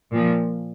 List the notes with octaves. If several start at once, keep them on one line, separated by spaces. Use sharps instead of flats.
A#2 F3